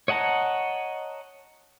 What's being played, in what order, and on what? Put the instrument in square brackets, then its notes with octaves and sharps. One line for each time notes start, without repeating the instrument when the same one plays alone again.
[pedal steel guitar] C#5 D#5 F#5 A5 A#5